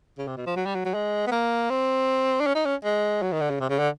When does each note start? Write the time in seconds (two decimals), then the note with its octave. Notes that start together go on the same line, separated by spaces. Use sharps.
0.18 C#3
0.27 C3
0.37 B2
0.47 F3
0.56 F#3
0.66 G3
0.75 F#3
0.85 F#3
0.94 G#3
1.27 B3
1.32 A#3
1.70 C4
2.41 D4
2.47 C#4
2.55 D#4
2.66 C#4
2.84 G#3
3.22 F#3
3.32 D#3
3.41 D3
3.50 C#3
3.61 C3
3.70 C#3
3.79 D3